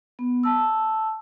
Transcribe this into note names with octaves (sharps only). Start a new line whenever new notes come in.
B3
A5 E6